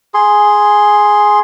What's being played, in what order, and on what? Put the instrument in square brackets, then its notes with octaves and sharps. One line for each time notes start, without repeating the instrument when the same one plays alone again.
[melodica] G#4 C6